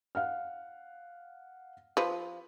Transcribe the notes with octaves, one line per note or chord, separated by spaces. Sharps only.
F5 F#5 F6
F3 B4